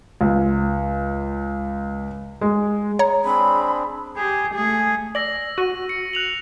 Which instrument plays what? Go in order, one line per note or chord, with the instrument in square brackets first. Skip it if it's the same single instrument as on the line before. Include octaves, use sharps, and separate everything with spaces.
[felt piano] C#2
G#3
[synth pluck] C#5 A#5
[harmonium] C4 D4 G#4 [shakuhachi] B5
[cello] G4 G#4
A3 G#4
[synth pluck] D5 [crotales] E6 A#6 F#7
[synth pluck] F#4 [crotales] D#7
[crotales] C#7
F#6 F7 F#7